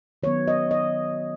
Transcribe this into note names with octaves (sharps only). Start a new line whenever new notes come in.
D#3 F#3 B3 C#5
D#5
D#5